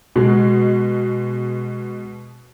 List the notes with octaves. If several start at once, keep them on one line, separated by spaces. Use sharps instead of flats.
B2 G#3